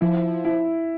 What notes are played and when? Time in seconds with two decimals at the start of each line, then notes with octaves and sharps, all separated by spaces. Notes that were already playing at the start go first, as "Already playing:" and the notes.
0.01 F3 E4
0.45 E4